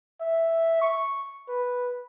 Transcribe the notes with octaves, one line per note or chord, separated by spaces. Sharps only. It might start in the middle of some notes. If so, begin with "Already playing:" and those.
E5
C#6
B4